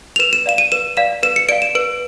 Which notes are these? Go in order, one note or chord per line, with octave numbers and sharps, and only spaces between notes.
F7
B4 E7
E7
D5 F5 E7
D#7
B4 E7
D5 F5 E7
B4 E7
C#7
D5 F5 D7
E7
B4 D7